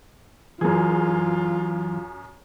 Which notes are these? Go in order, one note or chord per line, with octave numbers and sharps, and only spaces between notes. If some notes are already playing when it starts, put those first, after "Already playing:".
F#2 E3 F#3 F4 G#4